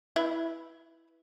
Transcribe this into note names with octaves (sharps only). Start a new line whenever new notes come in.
E4 B4 E5